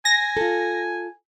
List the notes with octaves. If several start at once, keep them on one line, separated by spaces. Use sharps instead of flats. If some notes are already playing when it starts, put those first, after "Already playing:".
G#5 A#6
F4 A4